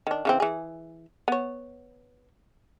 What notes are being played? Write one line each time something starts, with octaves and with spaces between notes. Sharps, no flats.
D#3 D4
C#3 E3 C4
E3 G#4
B3 C#5